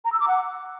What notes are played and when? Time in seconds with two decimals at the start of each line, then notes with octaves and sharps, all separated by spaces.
0.05 A#5
0.13 E6
0.20 D6
0.28 F#5